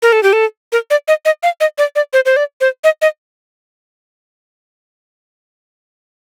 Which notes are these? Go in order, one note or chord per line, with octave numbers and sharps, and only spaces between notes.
A#4
A4
G4
A4
A#4
D5
D#5
D#5
F5
D#5
D5
D5
C5
C5
D5
C5
D#5
D#5